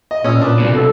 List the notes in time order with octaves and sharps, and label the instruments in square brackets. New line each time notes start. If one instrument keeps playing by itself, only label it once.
[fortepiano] D#5
[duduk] A#2 [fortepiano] C#4 D#6 E6
[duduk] A#2 [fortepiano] D4 B4
[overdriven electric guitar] C2 B2
[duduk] A4